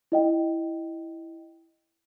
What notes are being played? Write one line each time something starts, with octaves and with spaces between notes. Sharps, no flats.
E4 D#5 G5